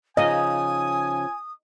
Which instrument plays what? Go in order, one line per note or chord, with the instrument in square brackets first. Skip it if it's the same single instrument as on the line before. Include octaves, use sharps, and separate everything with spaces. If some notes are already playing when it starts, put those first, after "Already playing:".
[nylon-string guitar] C#3 F3 D#4 [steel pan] D#5 [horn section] G#5 [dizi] D#6